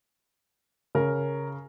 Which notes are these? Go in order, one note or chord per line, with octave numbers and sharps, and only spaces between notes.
C#3 A#4